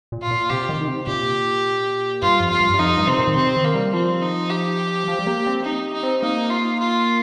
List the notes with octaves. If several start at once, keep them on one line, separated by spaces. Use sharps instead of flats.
A#2
F4
A#2
C3 G4
D#3
D#3
C3
A#2 G4
G2 F4
F2
F4
G2
G2
F2 D#4
G2
C3 C4
A#2
D#3
C3 C4
D#3
A#3
G3
F3 C4
D#4
G4
F3
G3
A#3
C4
D#4
D#4
C4
A#3 D#4
F4
F4